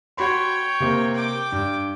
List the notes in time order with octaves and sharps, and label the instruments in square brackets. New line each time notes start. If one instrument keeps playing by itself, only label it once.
[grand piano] F#4 B5 C6 [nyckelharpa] C#5 G5
[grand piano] C3 A#3 C5
[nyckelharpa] G5 D6
[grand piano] G2